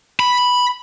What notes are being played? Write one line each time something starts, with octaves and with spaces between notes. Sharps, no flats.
B5